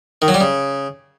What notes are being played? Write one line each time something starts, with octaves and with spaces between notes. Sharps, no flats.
D#3
F#3
G3
C#3